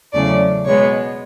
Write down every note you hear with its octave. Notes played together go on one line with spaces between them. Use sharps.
E2 C#3 F#3 A3 C#4 D5
B2 G#3 B3 C#5